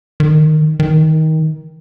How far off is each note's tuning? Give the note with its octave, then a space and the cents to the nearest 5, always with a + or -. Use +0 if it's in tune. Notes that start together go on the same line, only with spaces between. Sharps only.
D#3 -10
D#3 +20